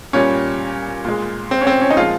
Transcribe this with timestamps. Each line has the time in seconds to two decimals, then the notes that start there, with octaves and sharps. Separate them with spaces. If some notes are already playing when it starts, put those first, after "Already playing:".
0.13 A#2 G3 C#4
1.05 A#2 G#3
1.51 C4
1.61 C#4
1.67 C4
1.81 C#4
1.90 D#4
1.97 A#2 F3 G#3 F4